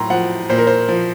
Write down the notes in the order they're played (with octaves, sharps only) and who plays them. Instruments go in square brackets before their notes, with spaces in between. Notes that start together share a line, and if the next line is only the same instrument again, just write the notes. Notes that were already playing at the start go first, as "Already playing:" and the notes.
Already playing: [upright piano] A2 F#3 A#5 C6
F3 F#5
A#2 C5
A#4
C5
F3